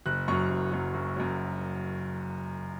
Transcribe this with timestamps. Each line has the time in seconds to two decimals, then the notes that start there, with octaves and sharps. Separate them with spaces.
0.06 F#1 F#6
0.28 F#2 F#3 C#6
0.50 F#1
0.72 F#2 F#3
0.94 F#1
1.17 F#2 F#3